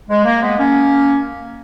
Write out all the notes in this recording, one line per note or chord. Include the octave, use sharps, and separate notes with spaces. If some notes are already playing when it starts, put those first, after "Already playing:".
G#3
A#3
G#3 B3
A#3 C#4